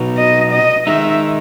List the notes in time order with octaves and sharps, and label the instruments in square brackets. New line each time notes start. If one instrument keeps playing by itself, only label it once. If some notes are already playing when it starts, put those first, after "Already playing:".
Already playing: [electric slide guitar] B2 F#3 B3 D#4
[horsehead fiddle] D#5
D#5
[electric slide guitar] D#3 G#3 D#4 [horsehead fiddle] E5